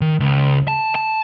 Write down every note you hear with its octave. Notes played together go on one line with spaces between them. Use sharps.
D#3
C#2
A5
A5